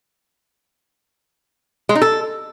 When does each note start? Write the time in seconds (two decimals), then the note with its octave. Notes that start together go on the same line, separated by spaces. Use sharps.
1.89 G#3
1.95 D#4
2.02 A4